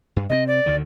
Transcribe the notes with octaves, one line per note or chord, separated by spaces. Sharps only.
G2
C3 A#3 C4 D#5
D5
D2 D3 D#3